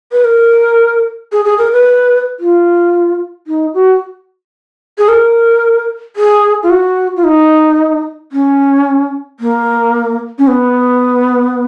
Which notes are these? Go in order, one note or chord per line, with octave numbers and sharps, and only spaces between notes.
B4
A#4
G#4
G#4
A#4
B4
F4
D#4
F#4
G#4
A#4
G#4
F4
F#4
F4
D#4
C#4
A#3
C#4
B3